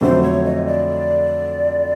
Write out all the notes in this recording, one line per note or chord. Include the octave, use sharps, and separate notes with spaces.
F2 D3 F#3 A3 C5
C#5
D#5
D5